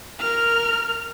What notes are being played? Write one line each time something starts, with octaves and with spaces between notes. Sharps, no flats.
A#4 F6